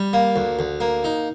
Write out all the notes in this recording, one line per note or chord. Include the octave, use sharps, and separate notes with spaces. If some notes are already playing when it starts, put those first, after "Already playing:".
Already playing: G3
A#3
D2
D2
A#3
D#4